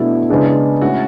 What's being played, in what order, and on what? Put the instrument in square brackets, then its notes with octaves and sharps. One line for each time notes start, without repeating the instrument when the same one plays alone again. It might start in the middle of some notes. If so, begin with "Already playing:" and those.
Already playing: [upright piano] B2 A3 D4 F#4 [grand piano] E4
[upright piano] C#3 G#3 B3 D4 G#4
[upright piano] A2 G#3 C#4 E4 [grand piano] F#4